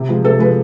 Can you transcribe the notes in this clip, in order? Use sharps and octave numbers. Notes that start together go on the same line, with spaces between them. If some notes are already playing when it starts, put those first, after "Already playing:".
Already playing: C3
F3 G#3
C3 A4
F3 G#3 B4